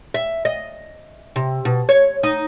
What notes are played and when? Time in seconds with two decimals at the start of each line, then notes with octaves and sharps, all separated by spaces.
0.14 E5
0.45 D#5
1.36 C3
1.65 B2
1.89 C#5
2.23 D#4